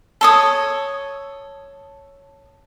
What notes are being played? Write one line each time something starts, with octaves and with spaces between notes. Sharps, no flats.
A4 C#5 D#6